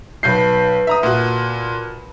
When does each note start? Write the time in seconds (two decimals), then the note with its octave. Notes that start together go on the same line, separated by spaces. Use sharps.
0.23 B1 B4 A5 G6 C7
0.87 E5 A#5 D#6
1.03 A#2 F#4 F#5